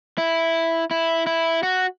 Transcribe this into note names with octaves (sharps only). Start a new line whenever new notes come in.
E4
E4
E4
F#4